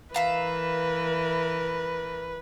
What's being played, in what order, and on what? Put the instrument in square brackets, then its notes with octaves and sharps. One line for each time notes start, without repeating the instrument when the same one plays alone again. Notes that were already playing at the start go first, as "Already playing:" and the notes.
[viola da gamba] E3 A#4 [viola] B4 [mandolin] E5 F5 A#5